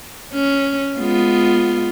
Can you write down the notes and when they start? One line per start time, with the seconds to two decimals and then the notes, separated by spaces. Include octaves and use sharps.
0.33 C#4
0.99 G#3 B3 F4